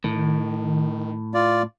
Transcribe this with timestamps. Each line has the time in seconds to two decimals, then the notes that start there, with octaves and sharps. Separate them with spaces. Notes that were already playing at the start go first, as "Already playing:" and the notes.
0.04 A2 D#3
1.34 F4 D5